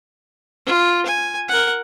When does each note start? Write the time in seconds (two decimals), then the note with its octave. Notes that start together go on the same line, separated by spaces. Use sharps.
0.66 F4
1.05 G#5
1.49 A#4 F#5